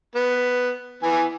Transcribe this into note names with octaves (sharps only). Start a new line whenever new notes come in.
B3
E3 B3 G#5